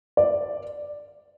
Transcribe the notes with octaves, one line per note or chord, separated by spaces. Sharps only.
D5